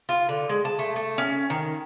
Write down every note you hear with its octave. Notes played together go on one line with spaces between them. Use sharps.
F4
D3
G#3
A5
A3
A3
C#4
D#3